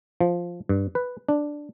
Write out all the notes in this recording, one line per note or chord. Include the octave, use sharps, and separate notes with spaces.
F3
G2
B4
D4